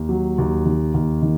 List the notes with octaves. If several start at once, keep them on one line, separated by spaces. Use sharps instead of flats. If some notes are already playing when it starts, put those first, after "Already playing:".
Already playing: D#2
F#3
D#2
D#3
D#2
D#3